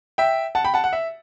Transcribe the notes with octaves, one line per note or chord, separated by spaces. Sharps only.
E5 G5
F#5 A5
G5 B5
F#5 A5
F#5
E5